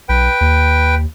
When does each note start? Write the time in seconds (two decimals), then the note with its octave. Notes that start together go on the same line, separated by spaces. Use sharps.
0.09 B1 B4 G5
0.41 D#2